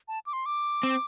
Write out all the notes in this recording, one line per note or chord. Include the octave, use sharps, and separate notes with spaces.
A5
D6
C6
D6
C4